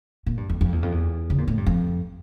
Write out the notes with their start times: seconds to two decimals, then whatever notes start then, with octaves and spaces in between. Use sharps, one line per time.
0.26 A#2
0.37 G2
0.50 F2
0.61 F2
0.72 E2
0.83 F2
0.92 E2
1.30 C#3
1.38 A#2
1.48 A2
1.58 G2
1.67 F2